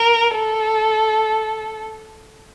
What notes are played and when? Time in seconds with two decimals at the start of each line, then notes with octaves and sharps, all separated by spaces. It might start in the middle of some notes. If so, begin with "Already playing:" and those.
Already playing: A#4
0.35 A4